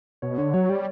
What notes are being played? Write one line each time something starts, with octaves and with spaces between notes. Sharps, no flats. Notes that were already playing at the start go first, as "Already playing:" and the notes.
B2 C#5
D3 C#5
F#3 C#5
G3 D5